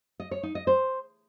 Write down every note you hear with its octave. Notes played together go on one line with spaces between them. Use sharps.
D#5
C#5
D#4
D#5
C5